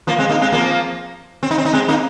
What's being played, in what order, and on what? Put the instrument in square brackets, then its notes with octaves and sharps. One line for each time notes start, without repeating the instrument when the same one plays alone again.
[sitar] F3 A#3
G#3 C4
A#3 D#4
G#3 C4
F3 A#3
C4
D#4
C4
D#4
G#3 C4
A#3 D#4